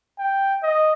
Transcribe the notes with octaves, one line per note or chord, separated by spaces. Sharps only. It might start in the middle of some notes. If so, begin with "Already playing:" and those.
G5
D#5